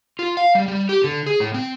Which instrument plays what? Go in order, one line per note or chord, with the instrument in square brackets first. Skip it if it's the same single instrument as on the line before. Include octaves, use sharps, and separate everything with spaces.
[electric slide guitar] F4
F5
G3
G3
G4
D3
G#4
A2
C4